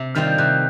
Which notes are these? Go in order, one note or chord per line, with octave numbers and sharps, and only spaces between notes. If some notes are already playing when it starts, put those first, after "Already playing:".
Already playing: C3
D#3 G3 C4 F4 F6
G6
C3 F#6